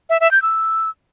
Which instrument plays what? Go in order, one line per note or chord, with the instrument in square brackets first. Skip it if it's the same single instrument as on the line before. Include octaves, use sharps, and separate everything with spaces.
[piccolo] E5
E5
G6
E6